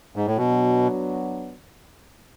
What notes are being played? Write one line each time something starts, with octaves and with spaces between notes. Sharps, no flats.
G#2
A2
B2 F#3 B3 D4 F#4